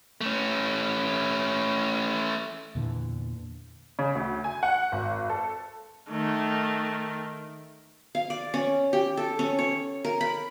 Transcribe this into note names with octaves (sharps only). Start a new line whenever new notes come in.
A3 C#4
E2 A#2 D3 E3
C#3
D2
G#5
F#5
G#1
A4
D#3 A3
F5
D5
C#4
G4
A4
C#4
C#5
A#4
B5